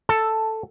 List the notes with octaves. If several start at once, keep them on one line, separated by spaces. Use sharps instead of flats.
A4